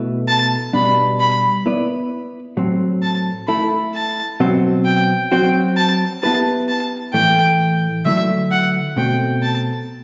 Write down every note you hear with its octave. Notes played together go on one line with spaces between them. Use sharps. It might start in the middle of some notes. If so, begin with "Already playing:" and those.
Already playing: B2 A3 E4 B4
A5
B2 G3 B3 D4 B5
B5
B3 E4 B4 D5
A2 F#3 C4
A5
A3 E4 A4 B5
A5
B2 F#3 C4 F#4 C5
G5
F#3 C4 F#4 G5
A5
B3 E4 G4 B4 A5
A5
A2 E3 A3 G5
D3 F#3 A3 E4 E5
F#5
B2 A3 C4 G5
A5